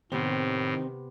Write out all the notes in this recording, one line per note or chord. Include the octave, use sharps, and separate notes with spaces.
A2 C3 D#3 B3 C4